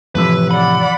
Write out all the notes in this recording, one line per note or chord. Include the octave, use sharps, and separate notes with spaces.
F2 A2 C3 E3 F3 B4 E6
D5 F#5 B5